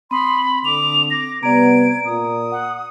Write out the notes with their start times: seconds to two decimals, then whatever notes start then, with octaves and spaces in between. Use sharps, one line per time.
0.11 C4 B5 C6 D#6
0.65 D3 D6 F7
1.10 D6 A#6
1.43 C3 G3 B3 D5 A#5 G#6 D7
2.05 A#2 D#6
2.52 F#5